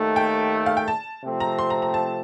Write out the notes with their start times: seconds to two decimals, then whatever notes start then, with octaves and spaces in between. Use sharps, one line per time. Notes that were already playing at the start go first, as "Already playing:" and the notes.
Already playing: D#2 D#3 A3
0.16 G5
0.66 F5
0.77 G5
0.88 A5
1.23 C3 F3 A3 C4
1.40 A#5
1.59 C6
1.70 A#5
1.82 A#5
1.94 A5